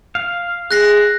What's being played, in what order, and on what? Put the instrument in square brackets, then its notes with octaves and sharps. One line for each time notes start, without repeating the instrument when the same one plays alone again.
[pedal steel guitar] F5
[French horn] G#4 [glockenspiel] F#6 A#6 C7